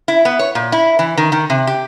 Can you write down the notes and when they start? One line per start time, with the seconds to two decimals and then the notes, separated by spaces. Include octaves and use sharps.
0.08 E4
0.25 B3
0.39 C#5
0.55 A#2
0.72 E4
0.99 E3
1.17 D#3
1.32 D#3
1.50 C3
1.67 G4